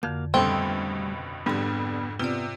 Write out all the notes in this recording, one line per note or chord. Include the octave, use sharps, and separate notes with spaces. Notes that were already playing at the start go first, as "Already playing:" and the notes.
F2 D3 A#3 F#4 F5 G6
C#2 G2 B2 G3 A3 C4 A4
F2 G#2 D3 G3 B3 B5
C3 B3 F4 D5